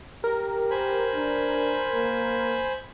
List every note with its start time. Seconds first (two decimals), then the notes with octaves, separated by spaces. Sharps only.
0.24 G4 A#4
0.71 C5 G#5 B5
1.14 D4
1.93 A#3